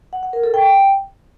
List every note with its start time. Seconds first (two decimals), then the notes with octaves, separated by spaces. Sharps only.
0.13 F#5
0.23 F#5
0.33 A#4
0.43 A4
0.54 G5